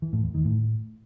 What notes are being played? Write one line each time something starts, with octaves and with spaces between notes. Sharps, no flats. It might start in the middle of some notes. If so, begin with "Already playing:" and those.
E3
A2
E2
D#3
A2